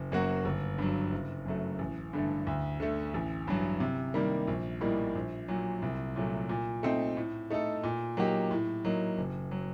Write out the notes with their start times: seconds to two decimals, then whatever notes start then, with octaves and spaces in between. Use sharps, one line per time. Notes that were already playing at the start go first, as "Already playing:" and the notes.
Already playing: F#1
0.12 F#2 F#3 A#3 F#4
0.45 G1
0.78 G2 F#3
1.12 F#1
1.46 F#2 F#3 A3
1.79 A1
2.13 G2 D3 A3
2.47 D2
2.80 D3 A3
3.14 A1
3.47 G2 F#3
3.80 C3
4.14 D#3 G3 A#3
4.47 A#1
4.81 A2 G3 A#3 D#4
5.15 A#1
5.48 A#2 F#3
5.82 C2
6.16 A#2 F#3 A3
6.49 A#2
6.83 A3 C4 D#4
7.17 A2
7.50 A3 D#4 A4
7.83 A#2
8.17 F#3 A#3 D#4 G4
8.51 A2
8.85 F#3 A#3 D#4
9.18 F#1
9.51 F#3